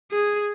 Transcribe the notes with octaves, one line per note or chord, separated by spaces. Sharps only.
G#4